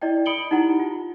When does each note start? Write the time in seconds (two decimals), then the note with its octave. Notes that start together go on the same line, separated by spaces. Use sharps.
0.02 E4 D5 D#5 G5
0.26 B5 D#6 C#7 D7 F#7 G7
0.51 D#4 E4 G4 F#5 A#5
0.80 F4